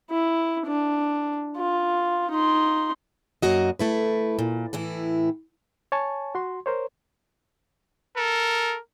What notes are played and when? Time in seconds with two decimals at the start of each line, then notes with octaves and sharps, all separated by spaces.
0.10 E4
0.66 D4
1.57 F4
2.31 D#4 C6
3.42 F#2 A#3 F#4 D#5
3.79 A3 E4 B4
4.39 A#2
4.73 A2 E3 E4
5.92 C#5 G#5 A5 C#6
6.35 F#4 C6
6.66 A#4 C5 C#5
8.17 A4 A#4